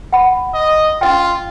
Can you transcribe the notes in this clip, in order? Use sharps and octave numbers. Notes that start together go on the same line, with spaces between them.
F#5 B5
D#5
C#4 F4 D#5 G5